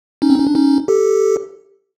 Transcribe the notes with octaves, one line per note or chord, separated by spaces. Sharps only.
C#4 D#4
C4
C#4
D4
C#4 D#4
G4 A4